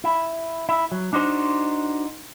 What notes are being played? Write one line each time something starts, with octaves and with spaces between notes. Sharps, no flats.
E4
E4
F#3
D4 D#4 F#4 C5